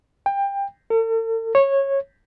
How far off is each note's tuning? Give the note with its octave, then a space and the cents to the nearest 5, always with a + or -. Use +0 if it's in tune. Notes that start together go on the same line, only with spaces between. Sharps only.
G5 +20
A4 +45
C#5 -15